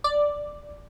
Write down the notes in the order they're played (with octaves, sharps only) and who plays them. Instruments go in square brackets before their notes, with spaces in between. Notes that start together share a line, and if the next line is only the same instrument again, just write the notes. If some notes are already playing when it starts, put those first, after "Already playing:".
[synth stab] D5